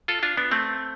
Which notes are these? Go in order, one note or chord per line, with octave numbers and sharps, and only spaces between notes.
F4 A4
D4 F4
B3 D4
A3 C4